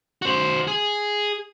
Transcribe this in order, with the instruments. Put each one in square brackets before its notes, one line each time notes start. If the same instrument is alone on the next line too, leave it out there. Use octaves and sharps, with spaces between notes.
[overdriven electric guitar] F#4 C5
G#4